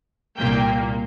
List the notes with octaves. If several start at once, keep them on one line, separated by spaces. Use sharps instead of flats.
C2 A#2 A#3 G5